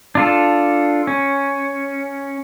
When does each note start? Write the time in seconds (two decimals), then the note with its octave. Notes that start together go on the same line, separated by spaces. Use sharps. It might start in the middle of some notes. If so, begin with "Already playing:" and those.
0.15 D4 F4 A4
1.07 C#4